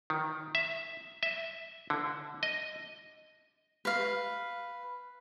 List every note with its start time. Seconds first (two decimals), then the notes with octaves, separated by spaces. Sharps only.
0.10 D#3
0.55 E5
1.23 E5
1.90 D3
2.43 D#5
3.85 B4 F5